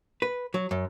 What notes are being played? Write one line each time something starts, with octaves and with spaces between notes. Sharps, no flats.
B4
F#3
F#2